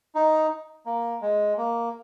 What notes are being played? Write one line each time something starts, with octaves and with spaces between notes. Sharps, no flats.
D#4
A#3
G#3
A#3